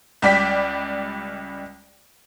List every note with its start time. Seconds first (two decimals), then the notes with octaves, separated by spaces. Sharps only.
0.22 C#2 G3 D5 G5 B6